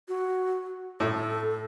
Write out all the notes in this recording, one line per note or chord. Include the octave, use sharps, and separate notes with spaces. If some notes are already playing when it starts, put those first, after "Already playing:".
F#4
A2 A4